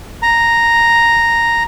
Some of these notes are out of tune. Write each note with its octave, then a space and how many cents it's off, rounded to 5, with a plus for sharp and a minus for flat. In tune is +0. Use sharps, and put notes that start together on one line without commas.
A#5 -5